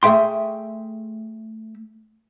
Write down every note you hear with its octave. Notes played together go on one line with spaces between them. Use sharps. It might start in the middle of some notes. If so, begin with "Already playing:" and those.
A3 G#4 E5 G5 C6